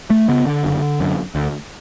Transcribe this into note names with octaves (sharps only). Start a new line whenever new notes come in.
A3
C#3 B3
D3
F#1
F#2 D3
D2